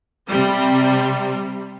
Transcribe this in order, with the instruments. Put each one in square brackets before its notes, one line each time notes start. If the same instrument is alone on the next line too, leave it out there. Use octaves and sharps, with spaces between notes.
[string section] C3 G3